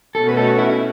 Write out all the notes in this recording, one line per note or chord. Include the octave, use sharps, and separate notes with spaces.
B2 A3 C#4 F#4 A4
B4
A4
E4
E4